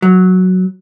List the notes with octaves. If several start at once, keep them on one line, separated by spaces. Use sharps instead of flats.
F#3